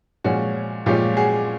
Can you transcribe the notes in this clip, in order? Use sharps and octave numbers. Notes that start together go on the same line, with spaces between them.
A#2 F3 G#3 C#4 F#4
A#2 F3 G#3 C#4 F4 G4
F#4 G#4